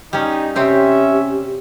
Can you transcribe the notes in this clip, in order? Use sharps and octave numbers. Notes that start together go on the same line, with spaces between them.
G3 C#4 D#4
C3 C4 C#4 G4 E5